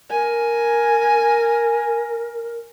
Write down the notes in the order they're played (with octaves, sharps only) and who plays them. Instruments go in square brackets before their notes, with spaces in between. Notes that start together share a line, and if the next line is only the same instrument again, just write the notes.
[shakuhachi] A#4 [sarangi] G#5